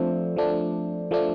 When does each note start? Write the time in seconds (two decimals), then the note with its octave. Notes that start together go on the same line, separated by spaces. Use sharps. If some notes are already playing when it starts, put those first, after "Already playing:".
Already playing: F3 A3 C4 D4
0.36 F3 A3 D4
1.11 F3 A3 D4